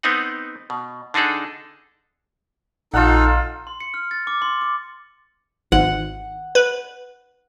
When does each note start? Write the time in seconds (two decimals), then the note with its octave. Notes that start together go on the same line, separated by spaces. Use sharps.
0.03 B3 C4 D#4 F#5
0.70 B2
1.14 D3 D4 D#4 G#4 A4
2.94 A#1 D#4 F4 A4 D#5 F#5 F6
3.67 C6
3.80 C#7
3.94 F6
4.11 A6
4.27 D6
4.42 C6
4.62 D6
5.72 G#1 F#5
6.55 B4